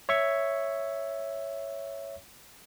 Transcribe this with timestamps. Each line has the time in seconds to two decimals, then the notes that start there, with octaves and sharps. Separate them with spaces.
0.09 C#5 E5 C#6